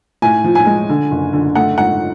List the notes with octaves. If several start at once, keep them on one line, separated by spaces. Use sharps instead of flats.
A2 G#5
F3
G#5
G#3
D3
F#1
D3
A3 F#5
G#2 F#5